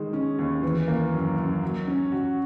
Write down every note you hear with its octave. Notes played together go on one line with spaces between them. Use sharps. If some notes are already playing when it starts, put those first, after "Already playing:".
Already playing: D#3 G#3
C#4
D#2
E3
A#3
F#2
F#2
F#3
C#4
F#4